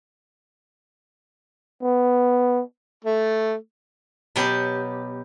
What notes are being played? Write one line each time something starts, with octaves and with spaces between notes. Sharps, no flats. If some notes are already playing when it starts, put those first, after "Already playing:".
B3
A3
B2 F#3 B3 G4